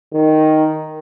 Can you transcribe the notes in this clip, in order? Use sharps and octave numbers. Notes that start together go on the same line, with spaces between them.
D#3